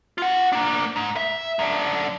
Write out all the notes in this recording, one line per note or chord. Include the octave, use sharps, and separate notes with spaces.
F4 F#5
A#3 D4
G#2
E5
F#2 D4